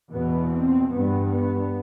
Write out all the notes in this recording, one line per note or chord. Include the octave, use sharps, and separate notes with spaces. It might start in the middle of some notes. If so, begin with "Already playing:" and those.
E2 B2 B3
C4
G2 B3
B3